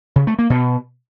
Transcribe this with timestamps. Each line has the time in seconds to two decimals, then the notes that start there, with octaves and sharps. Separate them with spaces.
0.16 C#3
0.27 A3
0.39 A#3
0.50 B2